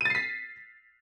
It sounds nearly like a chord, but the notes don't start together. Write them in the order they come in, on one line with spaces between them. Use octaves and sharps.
D#7 A6 C7 B6